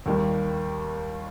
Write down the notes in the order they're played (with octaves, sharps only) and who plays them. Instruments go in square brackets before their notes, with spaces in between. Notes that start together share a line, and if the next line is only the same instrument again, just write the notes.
[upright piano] D#2 D#3 G3